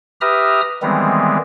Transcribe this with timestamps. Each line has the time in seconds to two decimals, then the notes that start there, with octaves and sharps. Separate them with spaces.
0.21 G4 B4 E5 A#5 D#6 F6
0.82 D#3 E3 G3 G#3 B3 C4